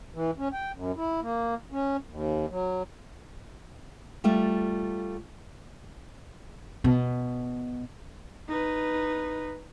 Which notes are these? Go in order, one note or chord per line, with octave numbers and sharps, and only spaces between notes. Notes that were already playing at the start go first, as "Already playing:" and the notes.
E3
C#4
G5
F#2
E4
A#3
C#4
D#2
F#3
G3 A3 F4 E5
B2
D#4 B4